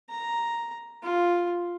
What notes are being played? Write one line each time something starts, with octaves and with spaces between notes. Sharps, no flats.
A#5
F4